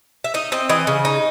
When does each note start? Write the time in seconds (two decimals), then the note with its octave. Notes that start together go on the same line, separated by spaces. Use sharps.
0.24 E5
0.34 D#4 D#5
0.52 C4 D#5
0.69 E3 D#5
0.87 C#3
1.05 D#4